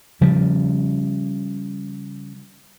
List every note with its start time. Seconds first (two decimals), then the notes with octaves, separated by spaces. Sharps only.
0.21 C#3 F3 G3